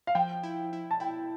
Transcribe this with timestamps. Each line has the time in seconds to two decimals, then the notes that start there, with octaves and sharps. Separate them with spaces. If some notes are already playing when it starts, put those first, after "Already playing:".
0.07 F5
0.15 F3 G5
0.43 E4
0.73 E4
0.91 A5
1.00 E4 G5